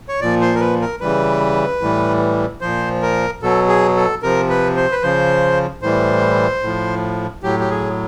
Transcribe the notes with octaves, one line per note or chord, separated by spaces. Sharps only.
C#5
A#2 F3 D5
C5
A#4
B4
A#4
C#3 E3 G3 B4
A2 E3 G3
A#2 F3 C5
A#4
B2 F#3 A4
G#4
A4
C3 F3 A#4
B4
C5
B4
C#3 F3 C5
A2 E3 G3 C5
A2 F3
A2 F#3 G4
G4
G#4